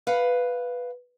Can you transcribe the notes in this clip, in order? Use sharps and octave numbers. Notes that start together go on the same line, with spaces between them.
B4 F5 F#5